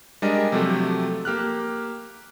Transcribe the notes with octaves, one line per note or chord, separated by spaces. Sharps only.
G3 G#3 D4 A#4 D#5
C3 F3 F#3 A3 G4 A4
A#3 G4 F6 F#6